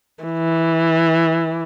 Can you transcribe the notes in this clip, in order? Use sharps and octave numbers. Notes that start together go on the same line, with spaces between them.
E3